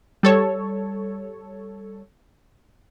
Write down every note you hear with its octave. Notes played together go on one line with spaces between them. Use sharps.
G3 A4 C#5